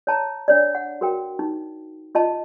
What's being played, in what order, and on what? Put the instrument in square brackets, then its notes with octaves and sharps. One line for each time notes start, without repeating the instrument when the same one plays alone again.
[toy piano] C#5 A5 A#5
D4 C#5 D5
F#5
F#4 A#4 G5
D#4
F4 D#5 A5